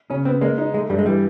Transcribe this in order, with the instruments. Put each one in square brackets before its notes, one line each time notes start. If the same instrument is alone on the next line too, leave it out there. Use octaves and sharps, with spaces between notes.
[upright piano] C#3 [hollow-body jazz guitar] C#4
[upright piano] B3 [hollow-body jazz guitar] C4
[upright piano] G#3 [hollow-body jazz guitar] A#3
[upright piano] D#4
[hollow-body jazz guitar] G#3 [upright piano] A3
[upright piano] G2 [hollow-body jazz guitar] G3
[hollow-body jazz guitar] G#3
[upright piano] E3 [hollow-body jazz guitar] G3